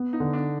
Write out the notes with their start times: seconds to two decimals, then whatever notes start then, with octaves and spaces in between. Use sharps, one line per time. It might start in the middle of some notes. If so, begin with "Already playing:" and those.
Already playing: B3
0.13 D#4
0.20 D3
0.33 D4